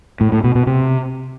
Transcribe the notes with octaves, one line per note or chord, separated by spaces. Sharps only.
A2
A2
B2
B2
C3